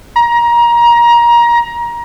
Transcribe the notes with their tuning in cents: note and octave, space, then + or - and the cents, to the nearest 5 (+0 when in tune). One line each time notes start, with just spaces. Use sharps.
A#5 +25